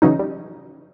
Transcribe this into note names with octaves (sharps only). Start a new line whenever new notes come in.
C#3 E3 F#3 C#4 D#4
G3